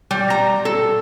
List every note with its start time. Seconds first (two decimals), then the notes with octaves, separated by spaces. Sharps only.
0.11 G3
0.30 A#5
0.65 A4